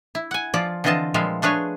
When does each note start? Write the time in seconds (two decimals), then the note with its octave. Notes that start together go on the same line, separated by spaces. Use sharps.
0.15 E4
0.31 F#5 G#5
0.54 F3 F4 D5
0.84 D3 E3 C4 F4 D#5 A5
1.14 A#2 F3 G3 G#3 E5 F5
1.42 A3 D4 G#4 B4 C#5